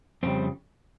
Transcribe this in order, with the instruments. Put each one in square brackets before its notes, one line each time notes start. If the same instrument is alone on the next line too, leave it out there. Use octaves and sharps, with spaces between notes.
[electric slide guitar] F2 C#3 G3 C4